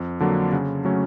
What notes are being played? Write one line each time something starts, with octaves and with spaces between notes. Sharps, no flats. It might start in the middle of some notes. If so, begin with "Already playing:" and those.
Already playing: F2
D3 F#3 A#3 D4
C#3
F#3 A3 C#4